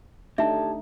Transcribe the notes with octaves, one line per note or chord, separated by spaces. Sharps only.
A3 D4 D#4 G4 E5 A5